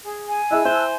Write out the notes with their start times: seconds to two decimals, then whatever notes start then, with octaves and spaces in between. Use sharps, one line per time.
0.04 G#4
0.28 G#5
0.51 E4 G#4 D#5 A5 E6 F#6
0.65 E4 C5